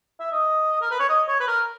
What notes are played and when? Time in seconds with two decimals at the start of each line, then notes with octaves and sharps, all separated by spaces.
0.20 E5
0.32 D#5
0.81 A#4
0.91 B4
0.99 C#5
1.09 D#5
1.28 C#5
1.40 B4
1.47 A#4